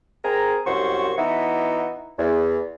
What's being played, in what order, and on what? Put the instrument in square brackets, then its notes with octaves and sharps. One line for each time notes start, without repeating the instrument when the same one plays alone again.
[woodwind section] C4 G#4 A#4 A#5
C2 F#2 F#4 C5 C#6
E3 B3 D#4 E4 F#4
E2